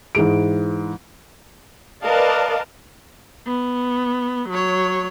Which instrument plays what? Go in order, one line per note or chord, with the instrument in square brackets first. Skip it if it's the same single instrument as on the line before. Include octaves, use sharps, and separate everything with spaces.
[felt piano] G#2 E3 G#3 D7
[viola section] A#4 B4 D5 D#5 F5 A5
[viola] B3
F#3 C#5